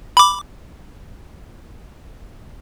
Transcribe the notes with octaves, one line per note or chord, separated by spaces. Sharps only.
B5 D6